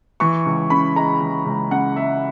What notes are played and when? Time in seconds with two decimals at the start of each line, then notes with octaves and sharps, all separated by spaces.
0.20 E3 C#6
0.46 C#2
0.70 C#3 B5
0.96 G#3 A#5
1.21 E3
1.46 C#2
1.71 C#3 F#5
1.96 G#3 E5